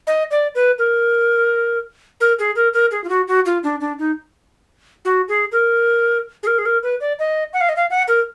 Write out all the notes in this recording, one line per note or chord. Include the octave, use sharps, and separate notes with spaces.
D#5
D5
B4
A#4
A#4
G#4
A#4
A#4
G#4
F4
F#4
F#4
F4
D4
D4
D#4
F#4
G#4
A#4
G#4
A#4
G#4
A#4
B4
D5
D#5
F#5
F5
D#5
F5
F#5
A#4